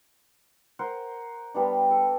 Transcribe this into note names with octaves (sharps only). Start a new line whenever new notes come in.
A#4 C5 F#5
G3 B3 D4
A4